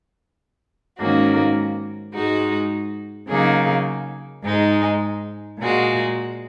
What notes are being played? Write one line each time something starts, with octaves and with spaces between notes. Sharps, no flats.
G#2 D#3 A#3 C#4 F#4
G#2 G#3 D#4 F#4
C#3 F#3 A#3 D#4 G#4
G#2 G#3 D#4
A#2 G#3 F#4